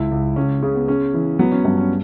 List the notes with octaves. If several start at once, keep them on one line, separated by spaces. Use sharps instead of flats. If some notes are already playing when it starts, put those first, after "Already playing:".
Already playing: C#2 E4
C#2
C#2 C#4
C#3 C#4
B3
C#3 C#4
E3
F#3 B3
C#4
G2 B3
C#4